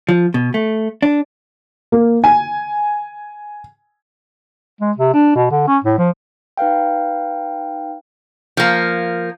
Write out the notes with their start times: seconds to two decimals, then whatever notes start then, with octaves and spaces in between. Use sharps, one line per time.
0.09 F3
0.34 B2
0.54 A3
1.02 D4
1.92 A#3
2.24 G#5
4.81 G#3
4.97 C3
5.13 D4
5.36 B2
5.51 D3
5.67 C#4
5.84 A2
5.98 F3
6.57 D#4 B4 F5 G5
8.57 F3 A#3